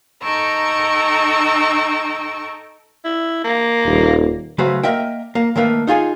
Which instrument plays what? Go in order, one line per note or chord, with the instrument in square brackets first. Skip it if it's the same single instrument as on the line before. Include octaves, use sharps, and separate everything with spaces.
[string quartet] D#4 A4 G5 A#5 C#6 E6
[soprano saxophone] E4
A#3
[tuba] D#1
[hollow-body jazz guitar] C#3 F#3 A3 F#4 B4 C5
A#3 A#4 D#5 E5 G5
A#3
D#3 A3 A#3 B4
D#4 F4 G#4 G#5